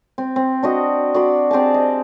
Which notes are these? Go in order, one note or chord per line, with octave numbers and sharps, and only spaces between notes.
C4
C4
D4 F#4 D#5
F#4 D5 B5 C6
C4 G4 G#4 A5
D#5